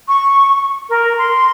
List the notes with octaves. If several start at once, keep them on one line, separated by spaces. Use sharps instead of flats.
C#6
A#4
C6